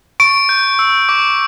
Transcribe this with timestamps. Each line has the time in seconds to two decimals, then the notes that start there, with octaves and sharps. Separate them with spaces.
0.20 C#6 D7
0.49 G6
0.79 E6
1.09 D6